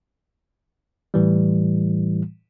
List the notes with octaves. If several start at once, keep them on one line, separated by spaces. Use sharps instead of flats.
A2 E3 G3